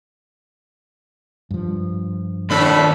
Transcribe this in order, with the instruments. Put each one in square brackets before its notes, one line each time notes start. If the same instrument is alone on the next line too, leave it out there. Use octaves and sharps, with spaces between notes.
[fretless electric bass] G2 F3
[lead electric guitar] D#2 D4 [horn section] A2 A4 B5